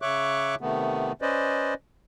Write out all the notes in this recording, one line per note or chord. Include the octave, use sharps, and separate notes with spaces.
C#3 C#5 E5 C#6 D6 F#6
C3 D#3 A3 B3
C#4 B4 C5 D5 D#5